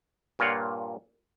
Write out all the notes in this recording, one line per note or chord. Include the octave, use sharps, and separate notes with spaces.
G2 A#2 A#3 F4 C#5 F#5